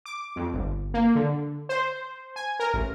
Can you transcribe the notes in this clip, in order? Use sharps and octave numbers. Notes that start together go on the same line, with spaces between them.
D6
F2
G1
A#3
D3
C5
G#5
A#4
A1